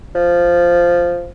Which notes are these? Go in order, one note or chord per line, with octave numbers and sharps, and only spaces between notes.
F3